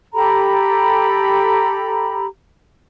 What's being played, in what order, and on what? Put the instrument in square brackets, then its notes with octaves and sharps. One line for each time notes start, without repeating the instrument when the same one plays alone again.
[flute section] G4 A4 A#5 B5